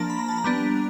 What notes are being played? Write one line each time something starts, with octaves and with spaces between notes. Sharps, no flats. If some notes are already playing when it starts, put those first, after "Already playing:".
Already playing: F3 A#3 D4 A5 A#5
B5
A#5
A5
A#5
G3 B3 D4